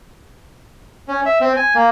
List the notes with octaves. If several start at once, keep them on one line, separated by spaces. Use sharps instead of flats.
C#4
E5
C4
G#5
A#3